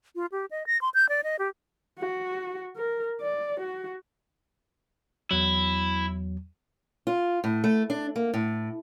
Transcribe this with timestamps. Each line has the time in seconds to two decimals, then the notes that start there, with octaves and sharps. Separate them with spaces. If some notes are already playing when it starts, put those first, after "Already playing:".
0.15 F4
0.32 G4
0.51 D#5
0.67 A#6
0.81 C6
0.94 G6
1.09 D5
1.23 D#5
1.39 G4
1.99 F#4
2.76 A#4
3.20 D5
3.60 F#4
5.31 E2 F#3 E4
7.07 F4
7.44 A2
7.64 A3
7.90 D4
8.16 A#3
8.34 A2